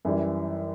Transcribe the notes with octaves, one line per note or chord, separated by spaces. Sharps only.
F#2 E3 G3